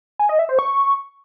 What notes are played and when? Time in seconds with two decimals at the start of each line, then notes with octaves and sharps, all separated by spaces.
0.19 G#5
0.29 D#5
0.39 E5
0.49 C5
0.59 C#6